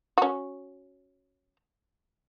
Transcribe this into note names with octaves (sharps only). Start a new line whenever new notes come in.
C#4 F#4